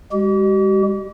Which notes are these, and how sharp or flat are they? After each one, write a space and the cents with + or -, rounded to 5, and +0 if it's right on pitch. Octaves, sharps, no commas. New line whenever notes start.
G#3 -35 G4 -45